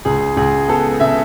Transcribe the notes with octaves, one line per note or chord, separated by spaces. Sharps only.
C#2 G#4
C#2 G#4
B3 A4
C#3 E5